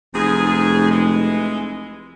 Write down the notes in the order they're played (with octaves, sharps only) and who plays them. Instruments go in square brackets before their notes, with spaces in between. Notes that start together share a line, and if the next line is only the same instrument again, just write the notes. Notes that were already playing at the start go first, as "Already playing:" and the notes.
[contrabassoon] F1 [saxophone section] E2 G#2 G#4
[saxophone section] E3 G#3